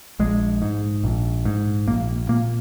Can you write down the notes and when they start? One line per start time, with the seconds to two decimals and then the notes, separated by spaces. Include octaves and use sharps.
0.19 A#1 G#3
0.62 G#2
1.04 A#1
1.45 G#2
1.87 A#1 A#3
2.29 A#2 A#3